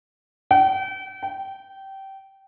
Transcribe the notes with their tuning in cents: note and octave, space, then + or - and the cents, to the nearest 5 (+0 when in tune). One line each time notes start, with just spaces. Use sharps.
G5 -40
G5 -20